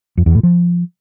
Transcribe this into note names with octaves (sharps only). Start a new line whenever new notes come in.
F2
E2
A2
F3